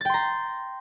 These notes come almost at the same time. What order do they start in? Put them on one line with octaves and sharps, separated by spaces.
A6 G5 C6 A#5